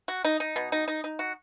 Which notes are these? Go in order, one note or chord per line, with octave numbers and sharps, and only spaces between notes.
F#4
D#4
D#4
B2
D#4
D#4
D#4
F#4